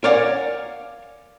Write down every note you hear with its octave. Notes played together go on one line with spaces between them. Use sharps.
A#4 C#5 D5 F5 F#5 G#5